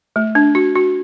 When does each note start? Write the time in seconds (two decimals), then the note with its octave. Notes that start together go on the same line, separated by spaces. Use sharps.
0.16 A3
0.35 D4
0.55 F#4
0.75 F#4